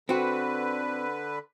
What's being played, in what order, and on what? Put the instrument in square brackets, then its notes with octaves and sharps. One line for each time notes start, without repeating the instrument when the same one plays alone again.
[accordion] D3 B4 [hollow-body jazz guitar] C4 F#4